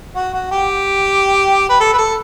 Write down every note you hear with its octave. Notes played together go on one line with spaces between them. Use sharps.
F#4
F#4
G4
B4
A4
B4
A4